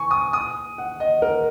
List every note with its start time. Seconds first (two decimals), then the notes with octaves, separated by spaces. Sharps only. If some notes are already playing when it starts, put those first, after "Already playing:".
Already playing: G#5 C#6
0.11 D#6
0.33 D#6
0.78 F#5
1.00 D#5
1.22 A#4